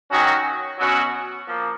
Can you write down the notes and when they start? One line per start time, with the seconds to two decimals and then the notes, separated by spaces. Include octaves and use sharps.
0.11 D#3 F#3 C#4 F#4
0.79 B2 F#3 C#4 F#4
1.46 F3 A#3